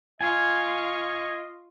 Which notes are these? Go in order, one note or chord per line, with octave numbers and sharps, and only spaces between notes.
F4 D#5 F5 G#5 C#6